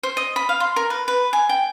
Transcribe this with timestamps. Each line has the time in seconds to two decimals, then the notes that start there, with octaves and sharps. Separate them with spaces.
0.03 C5
0.17 D#5
0.36 B5
0.49 F5
0.60 C6
0.76 A#4
0.90 B4
1.08 B4
1.33 G#5
1.49 G5